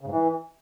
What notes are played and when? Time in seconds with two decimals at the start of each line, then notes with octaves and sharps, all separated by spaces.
0.01 C#3
0.06 G#2
0.12 E3